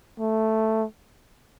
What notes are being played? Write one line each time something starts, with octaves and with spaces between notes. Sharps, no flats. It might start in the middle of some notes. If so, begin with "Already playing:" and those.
A3